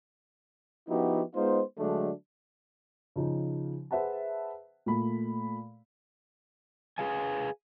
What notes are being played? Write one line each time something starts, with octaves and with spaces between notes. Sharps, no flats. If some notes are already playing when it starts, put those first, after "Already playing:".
F3 B3 D#4 E4 F#4 G4
G#3 B3 D#4 F4 C5
D3 F#3 G#3 A3 D4
C#3 F3 D#4
G#4 B4 C5 E5 F#5 A5
A#2 A3 B5
G#4 B4 F5 G#5